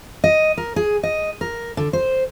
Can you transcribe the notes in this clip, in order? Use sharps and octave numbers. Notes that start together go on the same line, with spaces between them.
D#5
A#4
G#4
D#5
A#4
D3
C5